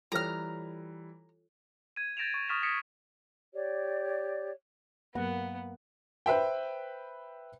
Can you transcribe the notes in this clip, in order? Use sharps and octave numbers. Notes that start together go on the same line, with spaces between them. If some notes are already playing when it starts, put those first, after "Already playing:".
E3 G3 F4 A4 C#5 A#5 F6
G#6 D#7
G6 A6 A#6 D7 E7 F7
C#6
C#6 D#6 F6 A6 B6 E7
D#6 A#6 B6 C#7 D7 E7
G4 C#5 D5
G2 F#3 A#3 B3 F#5
B4 C5 E5 G5